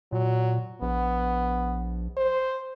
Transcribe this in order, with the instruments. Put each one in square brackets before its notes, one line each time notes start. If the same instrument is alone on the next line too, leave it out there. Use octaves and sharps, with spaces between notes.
[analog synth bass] A#2 [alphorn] F#3
[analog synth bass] A#1 [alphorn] B3
[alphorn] C5